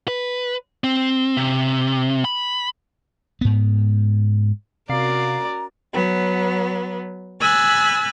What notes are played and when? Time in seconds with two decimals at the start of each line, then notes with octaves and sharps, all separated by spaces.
0.08 B4
0.84 C4
1.37 C3
2.25 B5
3.41 G#2 B3
4.89 C3 C#4 F#4 A#4 D5 F5 A#5 C7
5.93 F#3 B3
7.40 G#5 B5 E6 F#6 A6